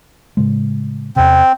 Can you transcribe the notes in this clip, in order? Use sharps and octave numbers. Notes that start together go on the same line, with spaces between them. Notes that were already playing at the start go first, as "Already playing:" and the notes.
A2 C#3 G#3
E2 C3 C4